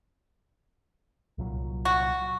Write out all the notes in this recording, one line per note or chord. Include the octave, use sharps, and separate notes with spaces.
C2 A#2 F#3
F#4